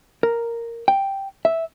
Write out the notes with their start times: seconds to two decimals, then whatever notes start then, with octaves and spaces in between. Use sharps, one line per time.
0.23 A#4
0.88 G5
1.45 E5